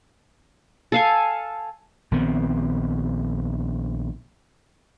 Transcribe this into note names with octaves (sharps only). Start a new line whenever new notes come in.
A4 F5 G#5
A#1 D#3 B3 C4